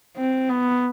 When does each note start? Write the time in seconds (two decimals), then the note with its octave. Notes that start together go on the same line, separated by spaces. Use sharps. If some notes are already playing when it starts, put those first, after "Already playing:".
0.17 C4
0.49 B3